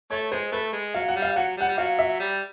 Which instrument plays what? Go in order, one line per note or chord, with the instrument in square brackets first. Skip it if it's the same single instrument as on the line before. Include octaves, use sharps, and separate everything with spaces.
[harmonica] A3 [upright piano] C#5
[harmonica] G#3 [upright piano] C5
[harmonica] A3 [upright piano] B4
[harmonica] G#3
[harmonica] F#3 [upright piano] F5
[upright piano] F#5
[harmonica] G3
[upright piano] F5
[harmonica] F#3 [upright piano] F#5
[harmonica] G3
[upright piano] F#5
[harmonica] G3
[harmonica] F#3 [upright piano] F5
[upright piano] E5
[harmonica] G3